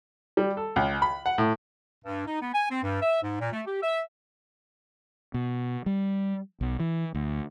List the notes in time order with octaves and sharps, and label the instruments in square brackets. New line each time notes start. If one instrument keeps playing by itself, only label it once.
[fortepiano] G3
A4
C#2
B5
F#5
A2
[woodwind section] G2
D#4
B3
G#5
C4
G2
E5
G#2
A#2
A3
G4
E5
[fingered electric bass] B2
G3
B1
E3
D2